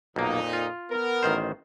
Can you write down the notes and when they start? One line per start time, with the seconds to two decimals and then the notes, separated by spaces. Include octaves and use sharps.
0.16 B1 F2 A#2 A#3 D#4
0.53 F4
0.91 B3 A#4
1.23 A1 D#3 C5